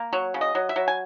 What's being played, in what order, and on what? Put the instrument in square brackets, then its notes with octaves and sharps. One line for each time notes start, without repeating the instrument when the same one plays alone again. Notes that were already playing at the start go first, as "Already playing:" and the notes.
Already playing: [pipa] A#3
F#3 C#5
C#3
D#5
F#3
E5
F#3
G#5